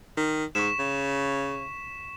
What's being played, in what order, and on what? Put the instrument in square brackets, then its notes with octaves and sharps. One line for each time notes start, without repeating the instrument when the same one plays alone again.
[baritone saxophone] D#3
[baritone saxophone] G#2 [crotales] C#6 B6 E7
[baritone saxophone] C#3